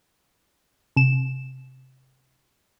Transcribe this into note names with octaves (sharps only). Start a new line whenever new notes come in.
C3 E7